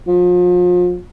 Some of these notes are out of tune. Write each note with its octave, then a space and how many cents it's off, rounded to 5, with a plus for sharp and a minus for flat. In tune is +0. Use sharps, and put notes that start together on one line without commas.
F3 +35